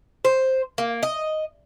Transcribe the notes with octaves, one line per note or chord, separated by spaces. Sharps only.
C5
A#3
D#5